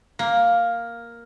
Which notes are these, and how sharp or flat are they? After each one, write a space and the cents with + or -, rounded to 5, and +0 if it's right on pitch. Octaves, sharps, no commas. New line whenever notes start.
A#3 +5